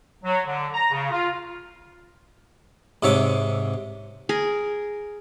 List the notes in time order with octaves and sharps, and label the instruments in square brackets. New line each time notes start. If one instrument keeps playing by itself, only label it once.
[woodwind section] F#3
D3
A#5
C#3
F4
[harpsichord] G#2 C3 C4 C#5 E5 D6
[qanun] G#4 A#4